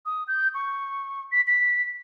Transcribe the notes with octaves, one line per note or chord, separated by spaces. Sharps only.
D#6
G6
C#6
B6
B6